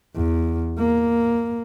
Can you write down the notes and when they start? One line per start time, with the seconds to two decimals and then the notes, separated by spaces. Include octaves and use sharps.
0.16 E2
0.78 A#3